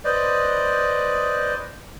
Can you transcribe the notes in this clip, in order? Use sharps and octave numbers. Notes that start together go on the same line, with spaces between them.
B4 C5 D5 D#5